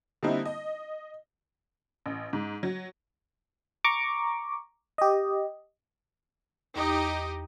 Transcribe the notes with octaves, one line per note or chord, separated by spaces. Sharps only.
D3 G3 A#3 C4 D#4 E4
D#5
A1
G#2
F#3
A#5 C#6 D6
G4 D#5
E2 D#4 G4 D#5